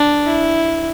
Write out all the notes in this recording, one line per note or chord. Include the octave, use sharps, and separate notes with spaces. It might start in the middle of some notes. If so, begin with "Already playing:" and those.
Already playing: D4
E4